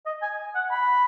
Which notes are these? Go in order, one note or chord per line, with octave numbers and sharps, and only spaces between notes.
D#5
G#5
F#5
B5